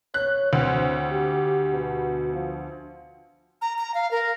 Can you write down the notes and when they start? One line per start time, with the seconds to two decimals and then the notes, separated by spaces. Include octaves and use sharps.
0.14 C#5 F#6
0.53 D2 C4
1.11 G4
1.72 B2
2.33 F3
3.62 A#5
3.78 A#5
3.94 F5
4.11 A#4